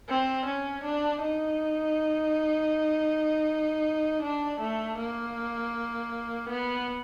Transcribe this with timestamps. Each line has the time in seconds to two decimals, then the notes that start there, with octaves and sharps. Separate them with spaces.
0.08 C4
0.46 C#4
0.84 D4
1.21 D#4
4.23 D4
4.61 A3
4.98 A#3
6.49 B3